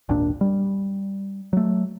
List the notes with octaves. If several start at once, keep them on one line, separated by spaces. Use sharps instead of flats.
G#1 D#2 A#2 D4
G3
F#3 A3